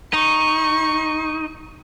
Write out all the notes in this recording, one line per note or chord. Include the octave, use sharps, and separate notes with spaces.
D#4 C#6